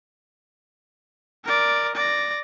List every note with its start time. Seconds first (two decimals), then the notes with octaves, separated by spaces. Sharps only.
1.45 A#4 D5
1.95 D5 A#6